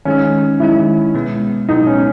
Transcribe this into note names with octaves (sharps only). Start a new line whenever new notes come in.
D#3 G#3 C#4 D#4
D#3 G#3 D#4 E4
B2 G#3 B3
B2 G#3 B3 D#4
C#4